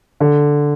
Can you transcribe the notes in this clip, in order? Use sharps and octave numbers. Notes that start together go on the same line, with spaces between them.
D3